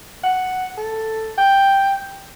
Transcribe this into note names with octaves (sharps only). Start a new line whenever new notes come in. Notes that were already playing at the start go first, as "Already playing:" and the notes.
F#5
A4
G5